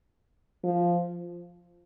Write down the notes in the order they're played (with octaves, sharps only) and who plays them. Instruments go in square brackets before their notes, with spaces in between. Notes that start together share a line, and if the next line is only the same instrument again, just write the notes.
[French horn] F3